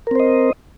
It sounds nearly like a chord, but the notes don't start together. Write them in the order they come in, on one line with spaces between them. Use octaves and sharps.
A#4 C4 C5 D#5